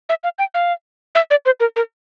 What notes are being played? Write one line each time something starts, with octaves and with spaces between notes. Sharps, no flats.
E5
F5
G5
F5
E5
D5
C5
A#4
A#4